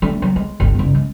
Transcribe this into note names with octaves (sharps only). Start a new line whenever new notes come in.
A3 D4
F#3
G#3
G1 D2
F#1 G2
G#3